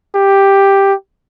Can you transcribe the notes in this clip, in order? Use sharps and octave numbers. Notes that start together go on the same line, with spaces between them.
G4